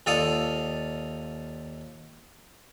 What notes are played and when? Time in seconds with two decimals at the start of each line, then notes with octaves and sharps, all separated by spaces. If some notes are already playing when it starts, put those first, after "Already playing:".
0.06 D#2 F4 A4 D5 F5 D#6